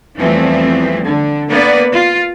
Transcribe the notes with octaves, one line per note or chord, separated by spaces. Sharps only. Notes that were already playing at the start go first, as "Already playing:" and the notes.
E2 E3 F3 G3 A3 C4
D3
A#3 B3 B4 D5
F4